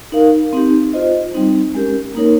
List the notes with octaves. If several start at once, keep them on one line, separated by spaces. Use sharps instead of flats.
D#4 A#4 F5
C4 D#4 G4
F4 C5 D#5
G3 C4 D#4
G#3 C#4 G4 A#4
A#3 D#4 A#4 C#5